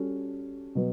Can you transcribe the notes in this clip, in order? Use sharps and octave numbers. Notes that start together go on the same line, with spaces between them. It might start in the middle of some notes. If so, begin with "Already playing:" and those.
Already playing: G3 C#4 F#4 A4
B2 F#3 B3